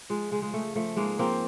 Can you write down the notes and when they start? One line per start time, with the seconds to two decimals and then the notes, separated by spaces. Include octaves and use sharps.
0.09 F3 G#3
0.31 C#3 G#3
0.42 G#3
0.53 C#3 A3
0.76 F3 A3
0.97 G#2 G#3 A#3
1.19 F3 A#3 C4